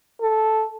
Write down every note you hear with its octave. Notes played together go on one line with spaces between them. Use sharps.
A4